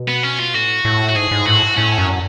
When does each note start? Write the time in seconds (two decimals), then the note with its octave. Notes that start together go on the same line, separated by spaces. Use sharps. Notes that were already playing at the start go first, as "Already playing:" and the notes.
Already playing: B2
0.08 B3
0.23 C#4
0.39 F4
0.54 A2 F#4
0.85 A2
1.09 F#4
1.15 G#2 G#4
1.31 G#2
1.46 A2 F#4
1.77 A2 C#4
1.98 F#2